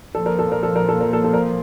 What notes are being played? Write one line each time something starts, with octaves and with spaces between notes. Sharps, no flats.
A#2 F3 A#3 A4
A#4
A4
A#4
A4
A#4
A4
A#4
A4
A4
A#4